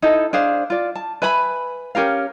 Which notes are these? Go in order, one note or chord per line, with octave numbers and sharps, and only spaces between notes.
D#4 E4 A4
D4 G#4 C5 F5
F4 D5
A5
B4 E5 G#5 B5
C#4 G4 A#4 F5